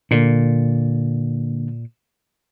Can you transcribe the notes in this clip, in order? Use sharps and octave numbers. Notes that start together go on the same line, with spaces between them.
A#2 D3 A#3